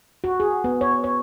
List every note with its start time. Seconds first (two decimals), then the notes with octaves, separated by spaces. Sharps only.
0.24 F#4
0.40 G#4
0.64 B3
0.81 C#5
1.04 C#5